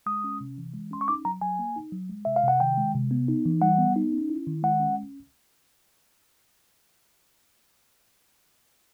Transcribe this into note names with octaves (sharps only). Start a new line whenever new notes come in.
G#3 D#6
C#4
C3
E3
G#3
C#4 C6
C#6
D#4 D6
F#3 A#5
F#3 G#5
A#3
D#4
F#3
G#3
C3 E5
F5
C3 F#5
D#3 G5
G#3
C3
B3
D#4
E3
G3 F#5
B3
D#4
C#4
E4
D#3
G#3 F#5
C#4